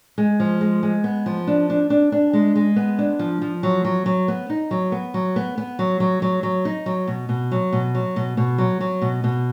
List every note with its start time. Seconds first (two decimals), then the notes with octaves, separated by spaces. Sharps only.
0.18 G#3
0.40 F3
0.61 G#3
0.83 G#3
1.04 B3
1.26 F3
1.47 D4
1.70 D4
1.90 D4
2.12 D4
2.33 G#3
2.55 G#3
2.76 B3
2.99 D4
3.19 F3
3.42 F3
3.63 F#3
3.85 F#3
4.06 F#3
4.28 B3
4.50 D#4
4.71 F#3
4.92 B3
5.14 F#3
5.36 B3
5.58 B3
5.79 F#3
6.00 F#3
6.22 F#3
6.43 F#3
6.65 D#4
6.86 F#3
7.07 B2
7.29 B2
7.51 F#3
7.73 B2
7.95 F#3
8.16 B2
8.37 B2
8.58 F#3
8.80 F#3
9.02 B2
9.24 B2